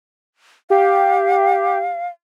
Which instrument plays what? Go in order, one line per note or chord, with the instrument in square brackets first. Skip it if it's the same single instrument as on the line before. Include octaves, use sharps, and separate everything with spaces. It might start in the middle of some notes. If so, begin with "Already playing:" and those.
[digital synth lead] G4 [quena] F5